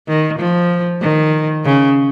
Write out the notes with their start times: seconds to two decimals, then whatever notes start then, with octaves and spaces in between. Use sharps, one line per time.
0.08 D#3
0.39 F3
1.02 D#3
1.65 C#3